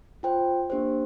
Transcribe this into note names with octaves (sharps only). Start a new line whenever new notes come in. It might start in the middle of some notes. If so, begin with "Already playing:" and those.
F4 C5 G5
A#3 D4 G4 C5